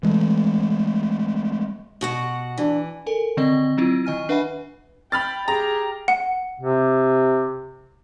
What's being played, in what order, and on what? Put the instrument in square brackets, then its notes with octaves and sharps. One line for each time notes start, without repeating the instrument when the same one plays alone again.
[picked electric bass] E3 G#3 A3
[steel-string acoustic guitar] B2 F#4 F#5
[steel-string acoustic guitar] E3 [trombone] D4
[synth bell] A4 A#4 G#5
D3 D#3 C4 D5 D#5
F#3 C4 E4 F4
D#3 D#5 G#5 F6 D#7
D4 B4 E5 F#5 G#5 B5
[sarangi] G5 [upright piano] B5 F6 A6
[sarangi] G4 [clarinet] G#4 [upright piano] A#5
[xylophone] F#5
[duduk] C3